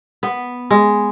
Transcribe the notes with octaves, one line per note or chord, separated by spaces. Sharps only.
B3
G#3